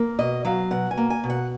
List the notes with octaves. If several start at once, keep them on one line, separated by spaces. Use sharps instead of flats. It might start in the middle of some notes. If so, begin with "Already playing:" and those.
Already playing: A#3
B2 D#5
F#3 F5
B2 F#5
G#5
A#3
G#5
B2
F#5